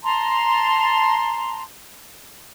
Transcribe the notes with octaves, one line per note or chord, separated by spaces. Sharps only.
A5 A#5 C6